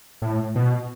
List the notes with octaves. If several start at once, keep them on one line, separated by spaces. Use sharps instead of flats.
A2
B2